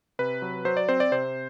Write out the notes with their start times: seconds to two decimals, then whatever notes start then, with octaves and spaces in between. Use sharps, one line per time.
0.19 C3 B4
0.42 F#3
0.65 F#3 C5
0.77 D5
0.89 C4 C5
1.00 D5
1.12 C3 C5